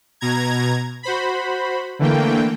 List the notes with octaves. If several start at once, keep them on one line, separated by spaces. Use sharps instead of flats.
B2 A#5 G#6
F#4 C5 B5
D3 E3 A3 A#3 G5